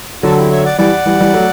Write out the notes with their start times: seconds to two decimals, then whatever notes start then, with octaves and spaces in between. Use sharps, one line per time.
0.23 D3 F#3 F#4 A4
0.37 E4 G4
0.51 C#5 E5
0.64 D5 F#5
0.78 E3 G3 D5 F#5
1.06 E3 G3
1.20 E3 G3
1.34 F#3 A3